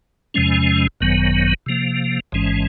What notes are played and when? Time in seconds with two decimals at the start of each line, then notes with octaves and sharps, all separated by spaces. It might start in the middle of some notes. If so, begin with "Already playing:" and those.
0.34 E2 C3 F3 G#3 C#4
1.01 G#1 F#2 D#3 F#3 B3
1.66 C3 F3 A#3
2.32 A1 G#2 E3 G#3 C#4